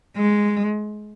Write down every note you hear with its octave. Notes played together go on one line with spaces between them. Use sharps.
G#3